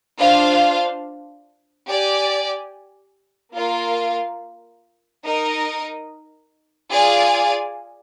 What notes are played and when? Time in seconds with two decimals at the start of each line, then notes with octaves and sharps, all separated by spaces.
0.19 D4 F4 C5 F5
1.86 G4 D5 G#5
3.54 A#3 F4 A#4 F5
5.22 D#4 A#4 D#5
6.90 F4 G#4 D5 F5 G#5